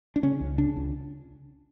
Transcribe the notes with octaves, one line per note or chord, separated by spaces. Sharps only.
D4
C#3 C#4
C#2
C#3 D4
C#2